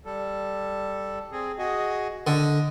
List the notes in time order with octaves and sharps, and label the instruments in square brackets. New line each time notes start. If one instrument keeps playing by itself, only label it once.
[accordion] G3 A4
C4 G#4
F#4 G#4 D#5
[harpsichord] D3 [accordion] D#5